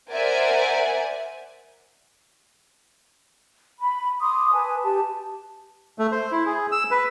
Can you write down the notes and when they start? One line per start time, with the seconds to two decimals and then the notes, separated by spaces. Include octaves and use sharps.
0.12 A#4 C5 D5 E5 F#5 G#5
3.79 B5
4.20 C6 D6 D#6
4.53 B4 G#5 A5
4.83 G4 A5
5.99 A3
6.12 C5
6.32 E4
6.46 G#4
6.72 E6
6.91 B4